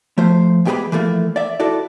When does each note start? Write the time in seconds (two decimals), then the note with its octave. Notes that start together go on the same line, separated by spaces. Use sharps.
0.18 F3 A3 C5
0.65 E2 G#2 G4 G#4 B4 B5
0.92 E3 F3 A3 A#3
1.36 D5 E5
1.60 E4 F#4 A4 D5